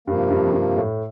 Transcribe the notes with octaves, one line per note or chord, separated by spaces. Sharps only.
G2 C3 F3 A#3
G2
F2
G2
A2